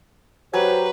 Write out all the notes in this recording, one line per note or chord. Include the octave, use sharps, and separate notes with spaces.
F#3 G4 B4 C5 G#5